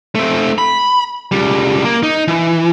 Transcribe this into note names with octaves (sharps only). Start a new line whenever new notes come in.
A3 C4
B5
C#2 G3
A#3
D#4
E3